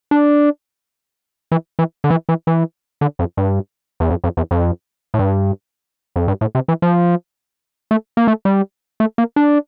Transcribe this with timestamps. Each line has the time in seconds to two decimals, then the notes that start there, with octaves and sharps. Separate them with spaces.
0.11 D4
1.52 E3
1.79 E3
2.04 D3
2.10 E3
2.29 E3
2.47 E3
3.01 D3
3.19 F2
3.37 G2
4.00 E2
4.10 F2
4.24 F2
4.37 E2
4.51 F2
5.14 A2
5.19 G2
6.16 F2
6.28 G2
6.41 A2
6.55 C3
6.68 E3
6.82 F3
7.91 A3
8.17 A#3
8.27 A3
8.45 G3
9.00 A3
9.18 A#3
9.36 D4